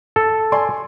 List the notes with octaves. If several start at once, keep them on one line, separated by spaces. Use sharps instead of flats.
A4
D5 G#5 C6